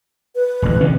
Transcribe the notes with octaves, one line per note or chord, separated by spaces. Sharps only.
B4
D#1 A1
C3 E3 C#4